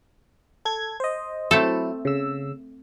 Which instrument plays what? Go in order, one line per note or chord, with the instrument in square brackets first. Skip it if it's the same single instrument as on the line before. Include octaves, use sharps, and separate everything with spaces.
[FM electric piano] A4 G#6
C5 D#5
[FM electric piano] F#3 E4 [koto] A3 C4 A4
[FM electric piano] C#3 E6